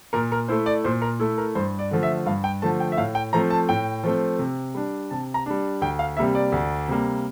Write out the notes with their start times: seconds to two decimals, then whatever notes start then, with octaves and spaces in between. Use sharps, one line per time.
0.13 A#2 A#4
0.32 A#4
0.48 A3 E4 C5
0.66 D5
0.84 A#2 C5
1.02 A#4
1.19 A3 E4 A4
1.38 A#4
1.55 G2 C5
1.79 D5
1.91 D3 F3 A3
2.03 E5
2.26 G2 F5
2.44 G5
2.62 D3 F3 A3 A5
2.80 G5
2.92 E5
2.97 A2 F5
3.15 G5
3.33 F3 A3 C4 A#5
3.50 A5
3.69 A2 G5
4.04 F3 A3 C4
4.39 C3
4.75 G3 D4
5.11 C3 A5
5.34 A#5
5.46 G3 D4
5.81 D2 G5
5.99 F5
6.17 C3 G3 A#3 E5
6.35 D5
6.52 D2
6.88 C3 G3 A#3